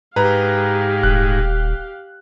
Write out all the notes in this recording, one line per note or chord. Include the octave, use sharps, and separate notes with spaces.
G#2 G4 B4 F5 A#5
D#1 F#6